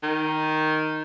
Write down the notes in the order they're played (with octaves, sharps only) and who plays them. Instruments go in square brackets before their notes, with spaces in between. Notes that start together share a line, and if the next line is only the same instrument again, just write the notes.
[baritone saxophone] D#3